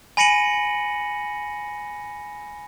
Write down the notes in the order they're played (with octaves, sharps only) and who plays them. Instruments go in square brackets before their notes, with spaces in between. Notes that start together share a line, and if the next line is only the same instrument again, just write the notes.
[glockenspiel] G#5 B5 A#6 C#7 D#7 F#7